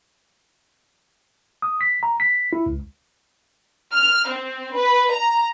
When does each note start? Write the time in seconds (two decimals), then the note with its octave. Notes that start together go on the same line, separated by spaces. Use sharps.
1.62 D#6
1.81 B6
2.03 A#5
2.20 B6
2.53 E4
2.66 C#2
3.94 F6
4.30 C4
4.77 B4
5.11 A#5